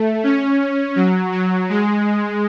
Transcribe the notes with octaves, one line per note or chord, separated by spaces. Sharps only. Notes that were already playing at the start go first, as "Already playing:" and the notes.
Already playing: A3
C#4
F#3
F#3
G#3